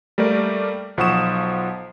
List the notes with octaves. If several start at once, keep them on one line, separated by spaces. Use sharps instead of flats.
G3 A3 A#3 A#4 D5
B1 F3 F#5 C#6 D#6 E7